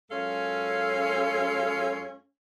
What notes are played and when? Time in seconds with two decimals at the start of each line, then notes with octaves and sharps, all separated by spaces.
0.11 F#2 G#3 C#4 F4 A4 F5